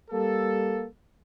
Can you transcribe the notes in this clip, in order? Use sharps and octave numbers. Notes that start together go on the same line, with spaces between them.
G3 A#3 A4